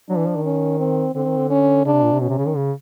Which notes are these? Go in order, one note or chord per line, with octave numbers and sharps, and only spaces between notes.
F#3 D4
E3
F3
D#3
C#4
C4
D3 C4
D#3
D3
C#4
C#3 D4
C3
A#2
C3
B2 C#4
C3
C#3
D#3
C#3